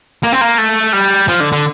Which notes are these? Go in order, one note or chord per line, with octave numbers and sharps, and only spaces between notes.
A#3
C4
A#3
A3
G3
F3
D3
D3